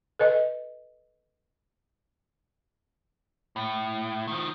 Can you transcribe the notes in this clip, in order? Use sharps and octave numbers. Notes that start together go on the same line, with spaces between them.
A4 B4 D#5
A2
D#3 F3